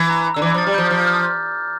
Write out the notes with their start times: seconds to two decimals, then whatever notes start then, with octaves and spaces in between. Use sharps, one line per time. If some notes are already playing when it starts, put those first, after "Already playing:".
Already playing: E3
0.09 A#5
0.34 D3 E6
0.42 E3 D6
0.54 F3
0.58 A6
0.67 G3
0.74 F3 G6
0.90 F3 F6
1.07 F6